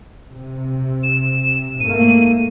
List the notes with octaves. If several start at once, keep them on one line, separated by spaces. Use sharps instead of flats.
C3
E7
G#2 A3 A#3 D#7